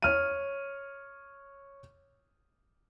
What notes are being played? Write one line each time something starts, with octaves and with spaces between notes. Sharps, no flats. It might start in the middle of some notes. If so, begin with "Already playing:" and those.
C#5 F6 D#7